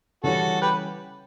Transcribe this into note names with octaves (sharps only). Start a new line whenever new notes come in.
C#3 E3 G3 C#4 F#4 A4
G4 B4